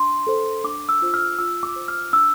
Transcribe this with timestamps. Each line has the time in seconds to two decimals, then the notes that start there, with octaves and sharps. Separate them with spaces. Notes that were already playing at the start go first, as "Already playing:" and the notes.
Already playing: D4 C6
0.27 A4 C5
0.64 D4 D6
0.89 E6
1.02 F4 C5
1.14 F6
1.39 F4 E6
1.63 D6
1.76 C5
1.88 F6
2.13 D4 E6